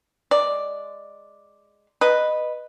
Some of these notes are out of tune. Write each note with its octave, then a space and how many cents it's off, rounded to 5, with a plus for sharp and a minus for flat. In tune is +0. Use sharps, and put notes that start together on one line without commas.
G#3 +0 D5 +0
B4 +0 D#5 -15